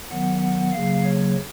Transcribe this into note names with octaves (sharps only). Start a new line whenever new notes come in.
D#3 F#3 B3 F#5
F#5
C#3 F#3 A#3 F5
C#5